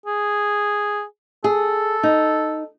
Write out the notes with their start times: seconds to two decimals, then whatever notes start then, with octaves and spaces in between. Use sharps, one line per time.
0.06 G#4
1.44 G#4 A4
2.03 D#4